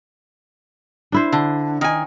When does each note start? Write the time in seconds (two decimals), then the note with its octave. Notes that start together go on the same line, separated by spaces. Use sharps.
1.12 D4 E4 C5
1.32 D3
1.81 D#3 G#5